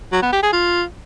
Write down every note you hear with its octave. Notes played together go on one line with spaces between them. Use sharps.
F#3
B3
G4
G#4
F4